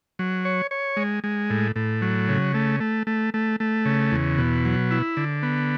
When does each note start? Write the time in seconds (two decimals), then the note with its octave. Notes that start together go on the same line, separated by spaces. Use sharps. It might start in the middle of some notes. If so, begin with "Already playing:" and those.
0.19 F#3
0.45 C#5
0.71 C#5
0.97 G#3
1.24 G#3
1.50 A2
1.76 A2
2.02 F#3
2.29 C#3
2.54 A3
2.80 A3
3.07 A3
3.34 A3
3.60 A3
3.85 C#3
4.12 E2
4.38 B2
4.65 F#3
4.91 E4
5.17 D3
5.43 B3